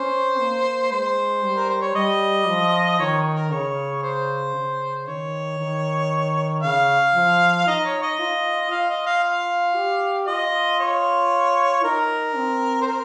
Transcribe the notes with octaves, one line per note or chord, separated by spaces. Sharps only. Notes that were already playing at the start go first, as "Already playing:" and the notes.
Already playing: C#4 C5
A#3
G#3 C5
G3
A#4
C5
C#5
G3 D#5
F3
D#3 C#5
A#4
C#3 C#5
C5
C#3
D#3 C#5
D#3
C#3 F5
F3
D#4 D#5
C#5
D#5
F4
F4 F5
D#5
F5
F5
G4
F4 D#5
C#5
D#4 A#4
C4
C5
A#4